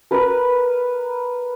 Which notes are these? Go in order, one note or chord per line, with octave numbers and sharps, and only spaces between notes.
A#4 B4